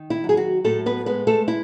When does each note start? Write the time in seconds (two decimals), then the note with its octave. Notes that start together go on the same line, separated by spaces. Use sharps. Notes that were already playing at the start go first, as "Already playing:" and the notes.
Already playing: D#3
0.10 E4
0.24 F#3
0.29 G#4
0.37 F#4
0.64 A2 A3 A4
0.86 B3 B4
1.06 G#3 B3 B4
1.27 A3 A4
1.48 E4